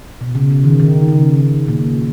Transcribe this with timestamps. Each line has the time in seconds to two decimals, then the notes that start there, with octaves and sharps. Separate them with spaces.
0.21 B2
0.35 C#3
0.50 C#3
0.64 D#3
0.80 D#3
1.08 C#3
1.68 A#2